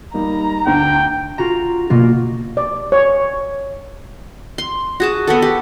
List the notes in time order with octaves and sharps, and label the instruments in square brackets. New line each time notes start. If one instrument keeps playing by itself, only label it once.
[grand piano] G3 A#3 D#4 [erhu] A#5
[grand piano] D2 D3 A3 [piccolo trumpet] G5
[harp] F4 F#4 A#5
B2 A#3 F4 F#4
[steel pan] D5
C#5
[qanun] C6
F#4 G#4 A5
B3 F#4 A4
G4